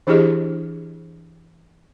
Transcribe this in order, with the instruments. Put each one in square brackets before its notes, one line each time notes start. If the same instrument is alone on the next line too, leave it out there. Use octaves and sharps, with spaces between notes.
[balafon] E3 D4 E4 G4 G#4 D#5